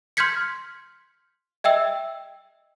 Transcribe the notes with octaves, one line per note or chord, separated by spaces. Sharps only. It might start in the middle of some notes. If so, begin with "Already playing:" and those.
C6 F6 G6 G#6 B6 C#7
D#5 E5 G5 E6